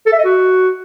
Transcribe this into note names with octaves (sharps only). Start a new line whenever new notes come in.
A4
E5
D#5
F#4